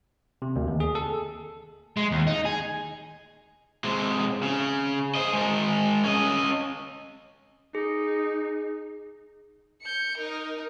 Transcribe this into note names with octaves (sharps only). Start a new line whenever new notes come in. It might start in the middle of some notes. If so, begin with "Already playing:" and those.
C3
D2
D#2
G#4
A4
G#3
D#2
D#4
G#4
C3 G#3
C#3
C5 D#5
G#3 A#4
C#4 D#5
D#4 G#4
G6 C#7
D#4 A#4